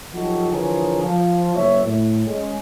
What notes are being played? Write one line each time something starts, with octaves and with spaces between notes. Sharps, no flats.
F3 F#3 D#4 F#4 G4 A4
D3 E3 F3 G#4 A#4 C#5
F3
F#1 C#5 E5
A2
G#3 C#4